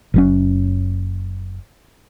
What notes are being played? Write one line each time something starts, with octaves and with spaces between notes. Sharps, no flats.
F#1 F#3 C#4